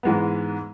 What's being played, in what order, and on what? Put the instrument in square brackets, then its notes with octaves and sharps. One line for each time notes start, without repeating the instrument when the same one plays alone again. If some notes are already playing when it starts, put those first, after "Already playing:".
[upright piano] G#2 E3 G#3 B3